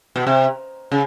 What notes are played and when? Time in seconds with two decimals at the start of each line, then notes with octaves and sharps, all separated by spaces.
0.16 B2
0.27 C3
0.92 C#3